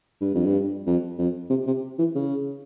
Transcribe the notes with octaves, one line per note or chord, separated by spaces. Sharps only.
G2
F2
G2
F2
F2
C3
C3
E3
C#3